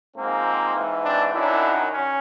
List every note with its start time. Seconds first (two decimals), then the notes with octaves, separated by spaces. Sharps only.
0.17 G#2 F3 A#3 C4
0.75 G#2 E3
1.04 C4 D4
1.33 F#2 D#3 F#3 D4 E4
1.91 C#4